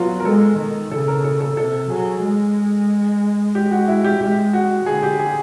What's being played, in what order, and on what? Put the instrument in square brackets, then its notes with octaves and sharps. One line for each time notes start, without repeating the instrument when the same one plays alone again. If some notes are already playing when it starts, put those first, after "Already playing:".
Already playing: [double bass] F#3 [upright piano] B3 F4
[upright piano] A#4
[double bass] G#3 [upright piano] A4
[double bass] D#3
[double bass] C#3 [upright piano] A4
[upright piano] A#4
A4
A4
[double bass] C3 [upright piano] A4
[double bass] F#3 [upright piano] G#4
[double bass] G#3
[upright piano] G4
F#4
E4
G4
[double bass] G#3 [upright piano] G4
[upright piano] F#4
[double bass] D3 [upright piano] G#4
[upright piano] G4
G#4